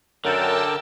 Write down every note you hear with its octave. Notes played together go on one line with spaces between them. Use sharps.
F#2 D3 A#4 G5 A5 E6